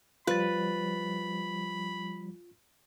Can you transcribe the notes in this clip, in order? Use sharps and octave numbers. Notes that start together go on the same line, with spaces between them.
F3 G3 F4 B4 B5 A6